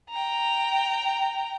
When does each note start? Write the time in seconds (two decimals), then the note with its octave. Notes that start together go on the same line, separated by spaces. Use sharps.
0.10 G5 A#5